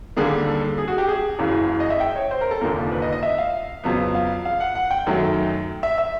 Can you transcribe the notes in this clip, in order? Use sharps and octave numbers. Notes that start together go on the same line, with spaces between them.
D#2 D3 G3 A#3 G#4
A4
G#4
F#4
G4
G#4
F#1 F#2 C#3 E3
D#5
E5
G5
C#5
C5
A#4
A4
F1 D#2 D3 F3 A#3 A#4
B4
D#5
D#5
E5
F5
F2 C#3 F#3 B3
F5
F5
F#5
F#5
G5
F#2 D#3 F#3 A3
E5
E5